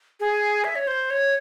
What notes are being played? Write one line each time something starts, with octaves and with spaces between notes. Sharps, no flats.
G#4
E5
C#5
C5
C#5